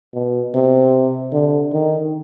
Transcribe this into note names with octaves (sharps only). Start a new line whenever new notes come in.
B2
C3
D3
D#3